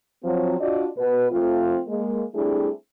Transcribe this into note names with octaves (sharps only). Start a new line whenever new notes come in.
F3 F#3 C4
D4 F4 F#4 D5 D#5
B2 B4
F3 A3 C4 F4
G#3 A#3
G3 A3 C4 D4 E4 G#4